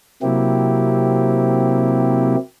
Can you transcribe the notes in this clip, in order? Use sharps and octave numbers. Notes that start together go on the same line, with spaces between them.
C3 F#3 A#3 C4 E4 G4